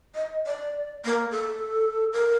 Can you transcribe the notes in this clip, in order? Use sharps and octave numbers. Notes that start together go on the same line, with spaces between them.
D#5
D5
A#3
A4
A#4